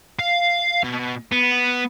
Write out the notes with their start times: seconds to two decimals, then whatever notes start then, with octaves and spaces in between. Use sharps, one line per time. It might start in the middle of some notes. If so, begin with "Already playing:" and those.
0.19 F5
0.83 B2
1.31 B3